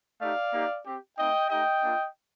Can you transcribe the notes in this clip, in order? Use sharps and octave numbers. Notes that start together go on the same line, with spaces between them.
A3 D#4 G4 D5 F5
A#3 D#4 G4
C4 G4
A3 C4 D#4 D#5 G5
A3 D#4 G4 D#5 G5
A#3 D4 F4